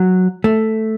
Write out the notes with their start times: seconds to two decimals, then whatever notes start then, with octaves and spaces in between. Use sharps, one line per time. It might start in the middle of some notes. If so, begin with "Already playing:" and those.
Already playing: F#3
0.44 A3